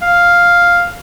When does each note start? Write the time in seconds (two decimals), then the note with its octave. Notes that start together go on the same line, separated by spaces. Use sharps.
0.02 F5